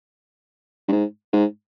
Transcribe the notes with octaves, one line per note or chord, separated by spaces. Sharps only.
G2
G#2
G#2